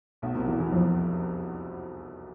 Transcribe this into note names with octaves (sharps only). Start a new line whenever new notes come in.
B1 B2
C2 C3
E2 E3
E2 E3
F2 F3